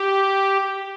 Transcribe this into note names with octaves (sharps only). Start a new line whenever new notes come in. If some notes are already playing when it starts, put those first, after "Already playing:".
Already playing: G4